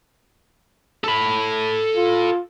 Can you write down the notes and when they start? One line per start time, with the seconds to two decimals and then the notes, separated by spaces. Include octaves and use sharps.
1.04 A4 B5
1.96 F4